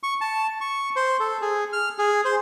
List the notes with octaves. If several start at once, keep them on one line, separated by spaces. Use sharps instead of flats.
C#6
A5
C#6
C5
A4
G#4
F6
G#4
C5